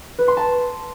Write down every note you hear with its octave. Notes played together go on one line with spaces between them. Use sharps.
B4
C6
A5